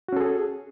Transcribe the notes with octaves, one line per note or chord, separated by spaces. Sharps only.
C#4 F#4 G#4 A4